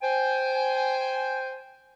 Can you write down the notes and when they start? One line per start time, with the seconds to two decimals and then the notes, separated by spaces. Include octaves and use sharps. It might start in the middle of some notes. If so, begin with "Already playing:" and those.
0.02 C5 G5 G#5